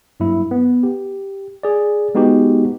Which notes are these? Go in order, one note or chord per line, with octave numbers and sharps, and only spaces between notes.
G2 F#3 A#3 E4
B3
G4
G#4 D5
G#3 B3 D#4 F#4 G4